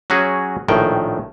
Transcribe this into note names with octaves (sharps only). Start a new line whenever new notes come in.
F#3 C#4 F#4 G#4
A#1 A2 D#3 G5